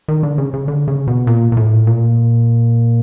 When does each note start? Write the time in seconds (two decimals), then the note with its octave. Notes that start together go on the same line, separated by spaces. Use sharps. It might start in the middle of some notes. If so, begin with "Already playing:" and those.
0.08 D#3
0.23 D3
0.38 C#3
0.54 C#3
0.68 D3
0.88 C#3
1.08 B2
1.27 A#2
1.52 A#2
1.57 A2
1.87 A#2